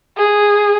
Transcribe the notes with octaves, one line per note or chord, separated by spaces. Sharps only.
G#4